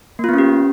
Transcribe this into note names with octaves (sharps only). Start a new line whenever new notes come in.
A#3 B3 C#4 F4 G4